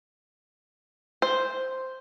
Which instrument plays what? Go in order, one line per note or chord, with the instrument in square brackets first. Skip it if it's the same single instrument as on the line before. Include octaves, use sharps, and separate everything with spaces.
[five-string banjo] C5